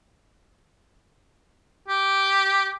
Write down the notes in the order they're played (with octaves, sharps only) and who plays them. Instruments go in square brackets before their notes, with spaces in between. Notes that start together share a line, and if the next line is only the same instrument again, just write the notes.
[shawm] G4